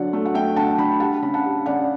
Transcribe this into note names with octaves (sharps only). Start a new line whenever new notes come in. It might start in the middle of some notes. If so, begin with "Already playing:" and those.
Already playing: D3 F#3 D5 F#5
A3
F#5
A3 E5 G5
D3 F#5 A5
D3 G5 B5
G3 F#5 A5
C#3 B5
F#5 A5
G3
C#3 D5 F#5